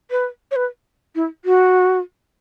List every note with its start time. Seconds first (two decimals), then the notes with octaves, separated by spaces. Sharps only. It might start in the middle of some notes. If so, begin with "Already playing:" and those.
0.11 B4
0.51 C#5
0.56 B4
1.15 E4
1.45 F#4